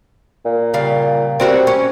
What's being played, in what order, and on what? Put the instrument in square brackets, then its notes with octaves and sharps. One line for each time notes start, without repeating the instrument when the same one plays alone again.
[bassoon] A#2
[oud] C#3 G3 F5
[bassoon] G3 [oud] C4 F#4 A#4
[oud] C#4